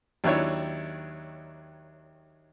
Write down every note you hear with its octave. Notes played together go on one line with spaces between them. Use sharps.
D#2 D#3 F#3 D4 E4 C#5